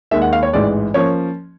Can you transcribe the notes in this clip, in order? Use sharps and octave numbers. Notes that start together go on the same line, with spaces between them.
D#2 D#3 G#3 E5
F#5
F5
C#5
A1 G#2 E3 G#3 D5
F3 A#3 C#4 C#5